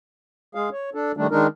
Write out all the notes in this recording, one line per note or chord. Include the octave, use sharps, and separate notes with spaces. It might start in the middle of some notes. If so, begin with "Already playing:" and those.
G#3 G#4 F5
C#5
D4 A4
D#3 G3 A3 D4
D#3 G#3 D4 D#4 A#4